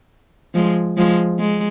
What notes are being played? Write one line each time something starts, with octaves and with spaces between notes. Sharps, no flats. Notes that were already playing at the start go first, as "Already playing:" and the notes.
F3 G#3
F3 G#3
G#3